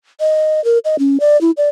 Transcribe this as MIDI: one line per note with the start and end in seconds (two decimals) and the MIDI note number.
0.20 0.63 75
0.64 0.78 70
0.85 0.96 75
0.99 1.17 61
1.20 1.39 74
1.41 1.51 64
1.57 1.69 74